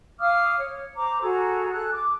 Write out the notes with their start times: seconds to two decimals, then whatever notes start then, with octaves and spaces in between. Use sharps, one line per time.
0.20 F5 D6 D#6 F6
0.58 C#5
0.96 C5 A#5 D6
1.22 F#4 G#4 A4 A#5
1.72 G#4 A4 F#6
1.92 D6